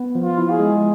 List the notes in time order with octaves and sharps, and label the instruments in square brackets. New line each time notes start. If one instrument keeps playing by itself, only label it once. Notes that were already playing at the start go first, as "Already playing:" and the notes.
Already playing: [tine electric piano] B3
F3
[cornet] F4
[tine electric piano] E4
[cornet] G#4
[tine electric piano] G#3